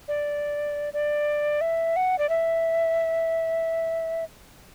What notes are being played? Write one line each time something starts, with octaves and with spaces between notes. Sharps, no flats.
D5
D5
E5
F#5
D5
E5